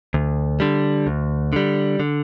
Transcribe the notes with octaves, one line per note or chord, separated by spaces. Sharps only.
D2
D3 G3
D2
D3 G3
D3